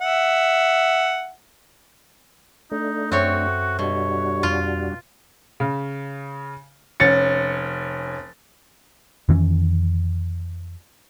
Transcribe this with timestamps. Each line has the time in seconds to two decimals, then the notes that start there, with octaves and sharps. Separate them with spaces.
0.01 E5 F#5
2.72 A3 D4 D#4
3.12 F#2 C4 F#4 A4 C#5 E5
3.79 B2 G3 D4 F#4 C#5
4.43 F2 F4
5.60 C#3
7.00 F1 C#4 A6 C#7
9.29 F2 D#3 E3 C#4